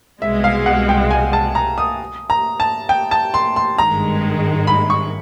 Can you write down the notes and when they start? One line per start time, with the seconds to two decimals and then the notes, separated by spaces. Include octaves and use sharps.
0.22 C2 B2 G#3 E5
0.44 F5
0.66 F#5
0.89 G5
1.11 G#5
1.33 A5
1.55 A#5
1.78 D#6
2.30 A#5
2.60 A5
2.89 G5
3.11 A5
3.34 C6
3.56 C6
3.78 G#1 G2 D#3 G#3 A#5
4.67 B5
4.90 C#6